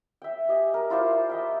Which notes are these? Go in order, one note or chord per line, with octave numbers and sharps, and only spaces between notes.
E5 G5
G4 D#5 G#5
A#4
E4 F4 C5 D5
D#5 E5 G5